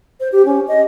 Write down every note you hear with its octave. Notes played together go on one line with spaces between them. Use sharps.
C5
G4
C#4
D#5